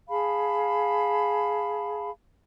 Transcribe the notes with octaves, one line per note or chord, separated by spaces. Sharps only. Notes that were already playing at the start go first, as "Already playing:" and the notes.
G#4 F5 A5 B5